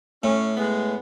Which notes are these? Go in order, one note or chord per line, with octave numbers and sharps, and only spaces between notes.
A2 C#4
G#3 B3